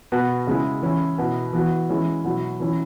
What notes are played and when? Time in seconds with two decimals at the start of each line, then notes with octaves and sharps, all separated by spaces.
0.12 B2 B3 F#4
0.47 C#3 G#3 E4
0.82 E3 C#4 E4
1.18 B2 B3 E4
1.53 E3 B3 F#4
1.89 E3 G#3 C#4 E4
2.24 B2 F#3 E4
2.60 E3 C#4 E4